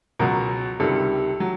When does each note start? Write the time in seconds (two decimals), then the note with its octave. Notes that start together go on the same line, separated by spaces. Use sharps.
0.19 C#2 B2 F#3 A#4
0.80 C#2 C3 D#3 G3 A4
1.40 F#3